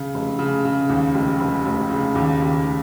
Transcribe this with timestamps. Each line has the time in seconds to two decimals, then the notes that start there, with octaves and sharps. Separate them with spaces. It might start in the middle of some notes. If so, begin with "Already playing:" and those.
Already playing: C#3
0.14 F1
0.39 C#3
0.65 C#3
0.89 D#2
1.14 F1
1.40 F1
1.66 F1
1.91 C#3
2.15 D#2
2.41 D#2